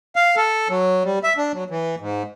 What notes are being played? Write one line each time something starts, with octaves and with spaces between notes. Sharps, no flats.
F5
A4
F#3
G3
E5
D4
F#3
E3
G#2